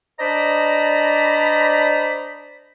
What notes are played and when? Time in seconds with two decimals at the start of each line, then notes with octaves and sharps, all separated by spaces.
0.19 D4 C5 D5 D#5 A#5 B5